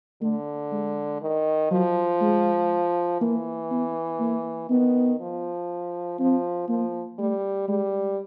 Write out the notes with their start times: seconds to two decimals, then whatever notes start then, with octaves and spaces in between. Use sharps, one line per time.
0.22 D3 A3
0.72 G#3
1.22 D#3
1.71 F3 F#3
2.21 G#3
3.20 E3 A#3
3.71 B3
4.20 A#3
4.70 D#3 B3
5.20 F3
6.19 F3 C4
6.69 F3 A#3
7.18 G3 A3
7.68 G3 G#3